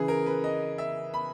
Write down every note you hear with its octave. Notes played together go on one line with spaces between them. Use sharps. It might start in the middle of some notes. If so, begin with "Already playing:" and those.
Already playing: C#3 E3 G#4
A#4
B4
D#5
E5
B5